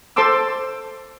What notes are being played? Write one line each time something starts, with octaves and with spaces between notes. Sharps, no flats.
A4 C5 A5 C6 D6 E6